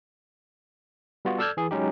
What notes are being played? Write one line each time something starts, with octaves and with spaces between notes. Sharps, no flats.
G3 B3 F4 F#4
A4 D5 E6 F6 G6 G#6
E3 G#4
F#3 G#3 C#4 D#4 G4